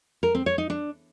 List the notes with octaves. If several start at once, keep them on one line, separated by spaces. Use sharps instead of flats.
A#4
C4
C#5
D#4
D4